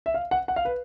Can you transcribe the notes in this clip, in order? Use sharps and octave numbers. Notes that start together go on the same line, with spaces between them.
E5
F5
F#5
F#5
F5
B4